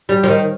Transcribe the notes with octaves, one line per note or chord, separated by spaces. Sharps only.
G3
F3
D#3